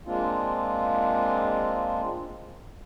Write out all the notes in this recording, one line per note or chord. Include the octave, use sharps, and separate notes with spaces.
G#3 A#3 C4 D4 F4